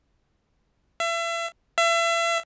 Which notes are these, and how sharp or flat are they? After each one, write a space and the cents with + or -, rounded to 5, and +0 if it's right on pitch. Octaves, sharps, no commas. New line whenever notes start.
E5 +35
E5 +35